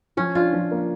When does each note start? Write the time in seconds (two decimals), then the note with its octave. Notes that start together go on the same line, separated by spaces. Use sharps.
0.17 F3 C#4
0.35 D4 F4
0.53 F3
0.71 A#3